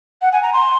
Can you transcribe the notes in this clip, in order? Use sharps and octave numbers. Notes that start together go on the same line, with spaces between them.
F#5
G#5
A#5
C6